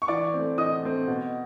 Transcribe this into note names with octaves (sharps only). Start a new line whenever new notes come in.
C#6
E3 D5 D6
A3 C4
E3 D#5 D#6
A3 C4
B2